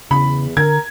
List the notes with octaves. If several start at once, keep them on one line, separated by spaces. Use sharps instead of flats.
E2 C#3 B5
D3 A#4 G#6